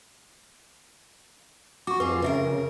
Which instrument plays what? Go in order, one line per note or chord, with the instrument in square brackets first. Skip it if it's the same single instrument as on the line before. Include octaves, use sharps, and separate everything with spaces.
[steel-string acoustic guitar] F#4 [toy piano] C#6 D6
[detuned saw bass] F2 [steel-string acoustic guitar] F4 G#4 [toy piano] B4
[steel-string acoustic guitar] F2 F#4 A#4 [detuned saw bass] C#3 [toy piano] B4 E5